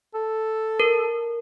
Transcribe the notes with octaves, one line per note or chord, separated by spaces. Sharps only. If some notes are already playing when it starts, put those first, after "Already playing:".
A4
A#4